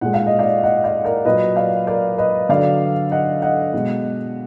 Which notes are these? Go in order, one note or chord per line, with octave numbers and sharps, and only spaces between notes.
A#2 G#3 F#5
F5
D#5
D5 F5
D#5 F#5
D5 F5
A#4 D5
A#2 F#3 B4 D#5
D5 F5
A#4 D5
B4 D#5
D3 F#3 D5 F5
D#5 F#5
D#5 F#5
B2 G#3